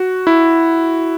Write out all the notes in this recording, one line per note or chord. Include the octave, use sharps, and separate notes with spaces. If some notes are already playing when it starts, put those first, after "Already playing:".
Already playing: F#4
E4